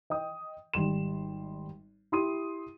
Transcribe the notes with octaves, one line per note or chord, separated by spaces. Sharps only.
D#5 G5 D#6
G#1 G3 C6 E7
E4 G4 C6 D#6 D#7